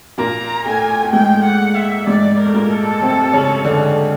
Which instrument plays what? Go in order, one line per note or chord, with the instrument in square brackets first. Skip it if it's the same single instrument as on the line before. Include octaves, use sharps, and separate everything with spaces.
[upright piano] A#2 A#3 [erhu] A#5
[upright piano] A2 A3 [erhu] G#5
[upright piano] A3
[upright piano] G#2 G#3 [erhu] G5
[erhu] F#5
E5
[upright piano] G#2 G#3 [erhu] D5
[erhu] A#4
[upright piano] A3
A#2 A#3
[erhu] A4
[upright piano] C3 C4
C#3 C#4
D3 D4